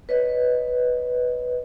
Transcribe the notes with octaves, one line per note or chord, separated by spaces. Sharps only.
B4 C#5 D#5